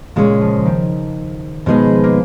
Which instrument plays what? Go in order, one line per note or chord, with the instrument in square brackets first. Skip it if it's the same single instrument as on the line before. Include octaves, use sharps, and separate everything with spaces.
[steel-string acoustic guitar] A#2 G#3 C#4 [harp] C#3
[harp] F3
D#3
[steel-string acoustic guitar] B2 G#3 D#4 G#4 B4 [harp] F3
[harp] A#3